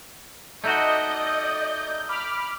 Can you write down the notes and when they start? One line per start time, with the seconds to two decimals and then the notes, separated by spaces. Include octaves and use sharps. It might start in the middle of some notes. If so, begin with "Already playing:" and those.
0.64 A3 D#4 F#4 D5 D#5 G6
2.09 B5 D6 F6